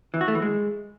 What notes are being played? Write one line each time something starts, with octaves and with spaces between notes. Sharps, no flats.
E3
F#4
A3
E3
G#3